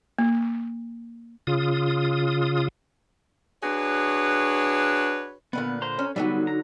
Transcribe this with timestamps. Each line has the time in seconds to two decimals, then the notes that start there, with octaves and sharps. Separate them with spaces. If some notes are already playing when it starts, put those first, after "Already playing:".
0.19 A#3
1.47 C#3 F4 D#6
3.63 D4 F#4 G#4 B4 C#5
5.53 A#2 D3 B3 B4
5.82 C5 A#5 C6
5.99 C#4
6.16 D3 E3 F#3 G3 B3 D#4 F#4
6.47 A#5